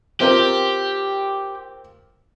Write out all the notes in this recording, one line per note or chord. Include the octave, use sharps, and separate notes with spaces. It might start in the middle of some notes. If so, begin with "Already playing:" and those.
C4 F4 G4 A#4